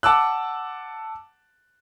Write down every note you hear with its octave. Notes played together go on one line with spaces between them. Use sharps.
F#5 A5 D6 E6 F#6